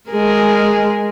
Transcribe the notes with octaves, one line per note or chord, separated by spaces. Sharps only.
G#3 G#4 A#4